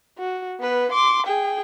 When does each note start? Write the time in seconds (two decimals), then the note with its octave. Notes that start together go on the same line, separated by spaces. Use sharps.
0.18 F#4
0.60 B3 B4
0.92 C6 D6
1.26 G#4 G5